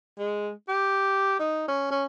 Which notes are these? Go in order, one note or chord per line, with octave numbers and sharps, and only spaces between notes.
G#3
G4
D#4
C#4
C#4